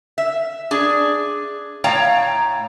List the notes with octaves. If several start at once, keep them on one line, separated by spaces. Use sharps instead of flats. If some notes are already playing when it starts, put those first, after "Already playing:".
E5
D4 G#4
A2 C#5 F5 G5 A#5